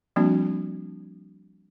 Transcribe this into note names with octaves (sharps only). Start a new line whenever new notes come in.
F3 G3 A#3 C4 D4 F#4